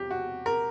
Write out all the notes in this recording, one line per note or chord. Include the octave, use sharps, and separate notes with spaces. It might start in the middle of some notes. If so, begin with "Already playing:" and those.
Already playing: E1 F3 G4
F#4
A#4